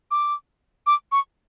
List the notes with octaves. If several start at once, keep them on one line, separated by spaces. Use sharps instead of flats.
D6
D6
C#6